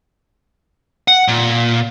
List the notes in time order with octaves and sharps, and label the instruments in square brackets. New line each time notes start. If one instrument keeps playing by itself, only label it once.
[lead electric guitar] F#5
A#2